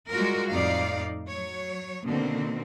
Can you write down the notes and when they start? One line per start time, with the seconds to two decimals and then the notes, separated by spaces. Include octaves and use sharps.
0.10 G3 G#3 F4 F#4 A#4
0.52 F2 A2 D#4 D5 F5
1.28 F#3 C#5
2.04 B2 D3 D#3 A#3 C4